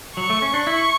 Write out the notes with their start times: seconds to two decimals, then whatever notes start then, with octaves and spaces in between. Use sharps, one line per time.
0.17 F#3 C#6
0.30 A3
0.42 C#4
0.54 D4
0.66 E4 C#6